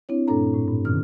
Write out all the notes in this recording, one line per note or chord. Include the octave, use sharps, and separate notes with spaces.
C4 D4 E4 C#5
G2 A#2 A3 D4 A4 A#5
A2
G2
F#2 B2 D3 D#3 C#4 F6